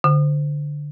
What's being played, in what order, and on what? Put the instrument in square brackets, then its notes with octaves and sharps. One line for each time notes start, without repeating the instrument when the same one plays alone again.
[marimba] D3